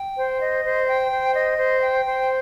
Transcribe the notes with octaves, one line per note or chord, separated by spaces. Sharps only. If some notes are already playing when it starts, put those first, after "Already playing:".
Already playing: G5
C5
D#5
C5
G5
C5
D#5
C5
G5
C5